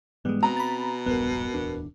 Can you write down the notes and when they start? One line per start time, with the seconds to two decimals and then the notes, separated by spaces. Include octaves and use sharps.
0.25 G#2 E3 G3 G#3 B3
0.43 B2 C4 A#5
0.57 B5 A6
1.06 E1 A#1 G2 B3 A#4
1.54 D1 E2 D4